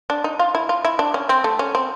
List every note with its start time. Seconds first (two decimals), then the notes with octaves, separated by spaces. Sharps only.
0.10 D4
0.24 D#4
0.39 F4
0.55 E4
0.69 F4
0.85 E4
0.99 D4
1.14 C#4
1.29 C4
1.44 A3
1.59 C#4
1.75 C4